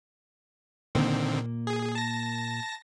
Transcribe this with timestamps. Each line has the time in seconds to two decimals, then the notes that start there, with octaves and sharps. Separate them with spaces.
0.95 A#2 D3 D#3 A#3 C4
1.67 G#4
1.95 A5 A#6